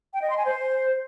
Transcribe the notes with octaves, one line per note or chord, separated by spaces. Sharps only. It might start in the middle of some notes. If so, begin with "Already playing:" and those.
G5
D#5
C6
G#5
C5